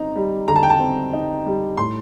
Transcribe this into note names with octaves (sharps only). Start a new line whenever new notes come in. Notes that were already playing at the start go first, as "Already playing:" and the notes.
Already playing: C4 D#4 A#5
G3
D3 A#5
A5
G5
A5
C4
D#4
G3
A2 C6